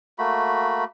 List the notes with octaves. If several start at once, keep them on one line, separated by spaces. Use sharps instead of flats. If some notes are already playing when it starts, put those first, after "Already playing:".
A3 A#3 F#4 B5